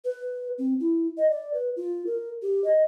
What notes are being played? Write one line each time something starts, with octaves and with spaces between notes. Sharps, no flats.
B4
C4
E4
D#5
D5
B4
F4
A#4
G4
D#5